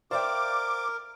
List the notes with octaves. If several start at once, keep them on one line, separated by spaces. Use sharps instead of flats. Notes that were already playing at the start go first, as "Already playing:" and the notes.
A#4 C5 D5 E5 F5 G5 D6